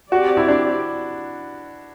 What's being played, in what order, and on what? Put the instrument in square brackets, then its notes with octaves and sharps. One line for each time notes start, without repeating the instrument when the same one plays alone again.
[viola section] C4 G4 D5 [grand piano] F#4
[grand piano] E4
D4